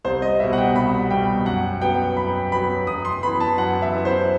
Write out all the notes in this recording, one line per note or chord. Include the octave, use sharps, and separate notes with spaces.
C2 C5
D#5
B2 G3 E5
F#5
G5
C2 B5
B2 G3 G5
F#2 F#5
F#3 B3 G5
F#2 B5
F#3 B3 B5
F#2 D#6
C6
E3 B3 B5
A5
F#2 F#5
E5
E3 B3
C5